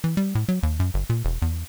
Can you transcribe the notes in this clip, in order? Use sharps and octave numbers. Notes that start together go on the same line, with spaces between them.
E3
G3
A2
F#3
D#2
F#2
G1
A#2
E1
E2